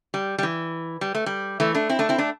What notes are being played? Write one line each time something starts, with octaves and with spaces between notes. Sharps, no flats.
G3
G3
E3
G3
A3
G3
E3 A3
A3 D4
C4 E4
A3 D4
C4 E4
A3 D4